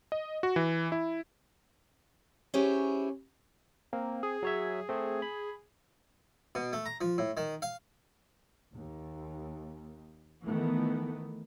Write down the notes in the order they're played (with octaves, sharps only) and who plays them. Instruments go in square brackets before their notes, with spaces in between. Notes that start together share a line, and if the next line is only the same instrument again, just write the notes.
[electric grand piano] D#5
F#4
E3
E4
[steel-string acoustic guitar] C#4 E4 G4 G#4 C5 C#5
[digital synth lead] A#3 [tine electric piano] C4
[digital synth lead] G#4
[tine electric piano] F#3 C#5 E5
A3 C4
B5
[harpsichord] B2
A3
A#5
F3
A2
D#3
F5
[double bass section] D#2
D#3 E3 A3 B3